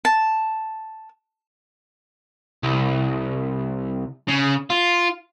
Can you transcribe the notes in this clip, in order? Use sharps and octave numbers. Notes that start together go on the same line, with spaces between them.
A5
C2
C#3
F4